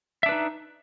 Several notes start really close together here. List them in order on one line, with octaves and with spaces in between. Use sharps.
E5 D4 B4 D#4